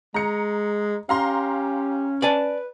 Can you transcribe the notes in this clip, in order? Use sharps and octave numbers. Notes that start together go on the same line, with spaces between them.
G#3 A#5 C#7
C#4 G4 F5 A#5 C6
B4 D5 G#5 A5